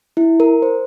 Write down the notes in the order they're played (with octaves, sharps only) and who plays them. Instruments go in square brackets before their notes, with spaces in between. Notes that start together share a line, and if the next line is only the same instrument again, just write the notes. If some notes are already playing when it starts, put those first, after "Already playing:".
[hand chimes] E4
A#4
C5